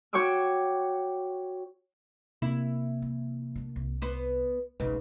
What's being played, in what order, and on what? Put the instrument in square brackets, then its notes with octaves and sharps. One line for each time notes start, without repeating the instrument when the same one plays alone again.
[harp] F#4 C#5 G5 C#6 D6 E6
[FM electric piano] C3 A#3 [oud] E4
[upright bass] E3
A3 D4
C2
[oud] B3 B4 C5
[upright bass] F#1 B1 [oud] G#2 C#3 [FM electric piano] B4